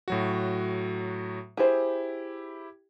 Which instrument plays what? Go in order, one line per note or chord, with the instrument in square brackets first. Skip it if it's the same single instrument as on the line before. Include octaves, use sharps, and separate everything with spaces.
[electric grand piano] A2 F#3 F#4
[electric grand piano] E4 G4 [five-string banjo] G#4 C5